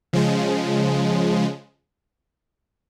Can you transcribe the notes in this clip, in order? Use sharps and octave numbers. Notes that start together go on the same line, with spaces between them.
C#3 F3 G#3